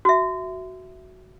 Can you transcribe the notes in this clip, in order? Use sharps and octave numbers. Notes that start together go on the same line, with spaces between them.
F#4 E5